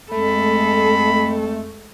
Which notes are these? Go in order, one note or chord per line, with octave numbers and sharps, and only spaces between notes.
F2 G#3 A3 A4 B5